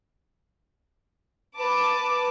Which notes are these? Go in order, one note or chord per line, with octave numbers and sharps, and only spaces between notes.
B4 A5 D6